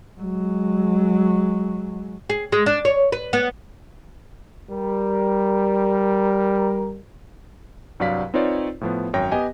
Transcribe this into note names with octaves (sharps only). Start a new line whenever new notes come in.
F#3 G#3
G#4
G#3
D4
C#5
B4
B3
G3 A#4
C2 G2 F#3 D5 F5 B6
C4 D#4 F4 B4 C#5 D5
A2 F3 B3
G#1 F#2 C#5 G5 A#6
B3 G4 D#5 G#5